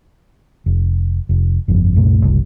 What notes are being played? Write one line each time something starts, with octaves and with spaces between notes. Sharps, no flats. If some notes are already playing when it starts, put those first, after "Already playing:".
F1
F1
G1 F2
C2 F#2 A#2 A3
F#1 C2